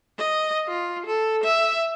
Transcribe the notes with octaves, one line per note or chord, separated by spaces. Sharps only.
D#5
F4
A4
E5